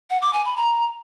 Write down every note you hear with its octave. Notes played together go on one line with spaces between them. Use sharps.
F#5
D6
G#5
B5
A#5